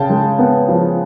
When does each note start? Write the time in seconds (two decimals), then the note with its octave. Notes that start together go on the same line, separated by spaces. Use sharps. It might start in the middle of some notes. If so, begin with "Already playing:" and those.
Already playing: C#3 G5 A5
0.09 G#3
0.39 B3
0.68 F3